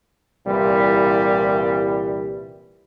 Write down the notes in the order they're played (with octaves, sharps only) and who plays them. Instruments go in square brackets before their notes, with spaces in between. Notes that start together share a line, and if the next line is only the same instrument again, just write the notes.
[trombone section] C2 A#2 E3 G3